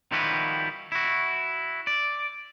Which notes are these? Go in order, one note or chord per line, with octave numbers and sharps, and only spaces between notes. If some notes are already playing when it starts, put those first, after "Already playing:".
D#3 F3 G3 E4 F#4 B4
E4 F#4
D5